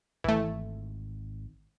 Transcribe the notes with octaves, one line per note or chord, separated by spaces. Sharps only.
G#1 E3 A3